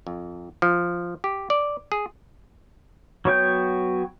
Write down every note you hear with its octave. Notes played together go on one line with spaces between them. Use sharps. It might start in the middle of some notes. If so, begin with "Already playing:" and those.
F2
F3
G4
D5
G#4
F#3 B3 C#5 G5 G6